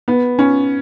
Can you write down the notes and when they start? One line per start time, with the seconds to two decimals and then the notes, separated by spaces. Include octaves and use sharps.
0.08 B3
0.39 C#4